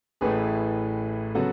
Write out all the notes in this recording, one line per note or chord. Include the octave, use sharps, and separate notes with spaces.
A1 A2 E3 A3 G#4 B4
C#3 F#3 B3 F#4 A4